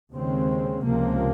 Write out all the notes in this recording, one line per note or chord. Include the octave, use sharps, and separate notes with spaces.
D#2 C#3 G#3 C4
C#2 C3 F3 A#3